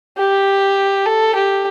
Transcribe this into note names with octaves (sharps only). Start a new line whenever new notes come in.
G4
A4
G4